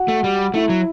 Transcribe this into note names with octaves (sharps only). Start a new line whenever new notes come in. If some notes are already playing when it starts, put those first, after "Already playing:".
Already playing: F#4
A3
G3
A3 E4
F#3